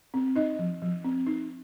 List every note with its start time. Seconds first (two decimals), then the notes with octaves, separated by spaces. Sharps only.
0.14 C4
0.36 D#4 D#5
0.59 F3
0.82 F3
1.04 C4
1.27 D#4